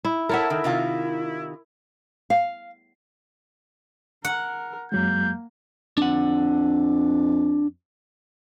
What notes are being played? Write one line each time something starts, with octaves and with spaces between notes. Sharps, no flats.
E4
E4 A4 A#4 C#5 E5 F#5
D#3
C3 D#3 F4
F5
A#4 F#5
F#2 F#3 G#3 A#3 G6
F2 D4 F#5